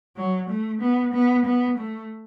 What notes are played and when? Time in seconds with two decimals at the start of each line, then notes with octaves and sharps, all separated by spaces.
0.16 F#3
0.49 A3
0.81 B3
1.13 B3
1.45 B3
1.78 A3